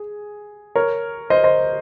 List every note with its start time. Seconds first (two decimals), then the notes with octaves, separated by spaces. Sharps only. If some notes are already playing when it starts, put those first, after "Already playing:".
Already playing: G#4
0.76 A#4 C#5
1.30 C5 D#5
1.44 C5 D#5